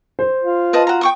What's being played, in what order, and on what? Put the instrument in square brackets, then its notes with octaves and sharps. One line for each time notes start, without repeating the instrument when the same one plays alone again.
[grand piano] C5
[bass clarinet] F4
[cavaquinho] B4 D#5 A5
F#4 A#5
G5 C#6 D#6